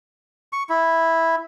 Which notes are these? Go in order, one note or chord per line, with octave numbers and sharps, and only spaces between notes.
C#6
E4